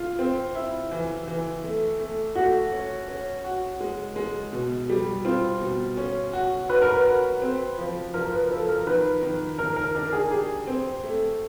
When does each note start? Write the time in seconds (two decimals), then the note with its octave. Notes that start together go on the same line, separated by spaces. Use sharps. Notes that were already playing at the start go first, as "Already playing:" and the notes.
Already playing: F4
0.19 C4
0.55 E4
0.91 E3
1.28 E3
1.64 A3
2.00 A3
2.35 A3 F#4
2.72 C#4
3.08 C#4
3.44 F#4
3.80 G#3
4.16 G#3
4.53 B2
4.89 G3
5.25 C4 F4
5.61 B2
5.97 C#4
6.33 F#4
6.69 F#4 B4
6.82 A#4
6.95 B4
7.06 F#4
7.42 C4
7.78 F3
8.14 F3 A#4
8.32 B4
8.50 F3 A4
8.68 A#4
8.87 D#3 B4
9.23 D#3
9.58 D#3 A#4
9.76 A#4
9.95 D4 A#4
10.13 G#4
10.31 G4 G#4
10.67 C4
11.03 A3